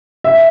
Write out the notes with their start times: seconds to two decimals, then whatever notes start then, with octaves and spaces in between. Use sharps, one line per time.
0.24 E5